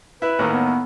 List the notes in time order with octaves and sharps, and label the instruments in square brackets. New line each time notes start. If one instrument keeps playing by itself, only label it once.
[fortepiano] E4 [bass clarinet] B4
[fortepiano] D#2 A2 D#3
[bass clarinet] B3